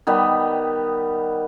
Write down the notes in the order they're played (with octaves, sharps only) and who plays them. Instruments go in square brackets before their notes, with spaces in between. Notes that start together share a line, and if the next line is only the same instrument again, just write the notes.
[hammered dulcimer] D#3 G3 B3